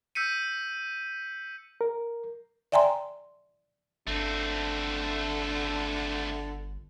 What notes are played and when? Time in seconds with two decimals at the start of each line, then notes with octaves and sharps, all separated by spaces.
0.15 E6 G6 B6 C#7 D#7
1.81 A#4
2.72 D5 E5 G5 G#5 A#5 C6
4.07 G1 D3 A3 C4